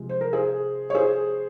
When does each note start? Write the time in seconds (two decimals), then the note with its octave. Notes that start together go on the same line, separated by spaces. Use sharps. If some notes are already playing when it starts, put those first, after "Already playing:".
Already playing: C3 F3 G#3
0.09 C5
0.21 A#4
0.33 G#4 C5
0.90 C#5
0.95 G#4 C5